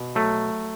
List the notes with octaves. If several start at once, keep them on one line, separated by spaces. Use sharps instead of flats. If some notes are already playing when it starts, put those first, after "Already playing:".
Already playing: B2
F#3 A3